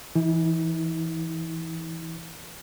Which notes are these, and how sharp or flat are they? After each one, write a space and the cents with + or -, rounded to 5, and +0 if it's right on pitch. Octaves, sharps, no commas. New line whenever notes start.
E3 +10 E4 -45